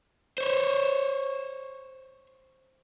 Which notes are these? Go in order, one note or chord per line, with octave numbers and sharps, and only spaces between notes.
C5 C#5